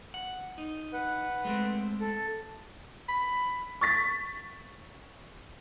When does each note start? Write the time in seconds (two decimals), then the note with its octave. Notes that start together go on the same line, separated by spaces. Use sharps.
0.14 F#5
0.58 D#4
0.93 B4 F#5
1.45 G#3 A3 C4
2.01 A4
3.08 B5
3.81 C#6 A6 B6